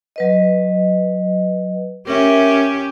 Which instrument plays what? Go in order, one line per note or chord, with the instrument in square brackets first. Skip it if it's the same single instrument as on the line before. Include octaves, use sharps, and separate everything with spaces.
[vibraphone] F#3 B4 D#5
[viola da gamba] C#4 G4 [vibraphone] A#4 E5